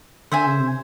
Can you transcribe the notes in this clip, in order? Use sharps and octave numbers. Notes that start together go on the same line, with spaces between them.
D3 C5 E5 G#5
C#3
C3